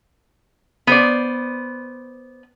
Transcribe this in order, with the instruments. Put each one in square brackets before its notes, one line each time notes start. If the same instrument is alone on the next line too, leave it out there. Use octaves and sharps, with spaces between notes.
[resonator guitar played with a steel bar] B3 C5 D5